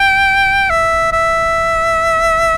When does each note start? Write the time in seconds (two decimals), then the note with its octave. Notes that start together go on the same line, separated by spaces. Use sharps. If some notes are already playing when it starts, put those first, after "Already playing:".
Already playing: G5
0.70 E5
1.12 E5